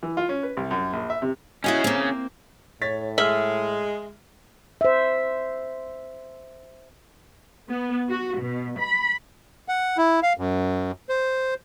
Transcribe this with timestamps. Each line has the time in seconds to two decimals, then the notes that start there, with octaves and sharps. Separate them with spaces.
0.03 E3
0.17 F4
0.29 C#4
0.43 B4
0.57 C2
0.71 F#2
0.93 A#1
1.10 E5
1.22 C3
1.64 C#4 E4 F#4 G#4 D#5
1.84 A#3 C4
2.82 A2 C#5 A6 B6
3.18 G#3 E5 F6 F#7
4.81 C5 E5
7.70 B3
8.09 F#4
8.39 B2
8.78 B5
9.69 F#5
9.97 E4
10.23 F5
10.37 F#2
11.09 C5